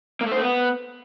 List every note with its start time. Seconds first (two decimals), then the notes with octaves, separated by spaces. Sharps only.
0.21 A#3
0.26 A3
0.32 C5
0.37 A3
0.42 B3